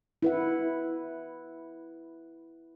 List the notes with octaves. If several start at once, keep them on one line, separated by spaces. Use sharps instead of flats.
E4 B4 F#5